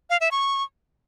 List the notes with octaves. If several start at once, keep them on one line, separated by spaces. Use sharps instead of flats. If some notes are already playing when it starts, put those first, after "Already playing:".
F5
E5
C#6